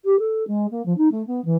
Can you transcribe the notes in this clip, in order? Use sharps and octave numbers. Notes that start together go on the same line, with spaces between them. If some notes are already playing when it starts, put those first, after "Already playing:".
G4
A4
G#3
A#3
F3
D#4
A3
B3
E3